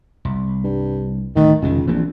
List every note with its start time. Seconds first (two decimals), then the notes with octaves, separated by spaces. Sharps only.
0.25 C2
0.64 G2
1.36 D1 D3 D#3 A3
1.62 F1 C#2 D#3
1.87 A#1 E3 C4